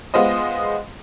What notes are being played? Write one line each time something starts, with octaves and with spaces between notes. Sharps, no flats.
G#3 B3 F4 C5 D#5